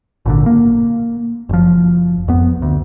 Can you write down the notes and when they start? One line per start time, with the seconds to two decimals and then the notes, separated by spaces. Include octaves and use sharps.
0.26 G#1 A#2 D3
0.46 A#3
1.49 F#1 F3
2.28 F2 B3
2.62 D2